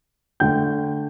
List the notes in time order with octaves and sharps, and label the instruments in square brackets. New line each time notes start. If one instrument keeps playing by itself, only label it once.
[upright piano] D3 A3 G5 G6